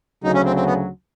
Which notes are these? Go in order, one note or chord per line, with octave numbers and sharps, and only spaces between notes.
D2 C#3 F#3 D#4
C#4
C4
C4
B3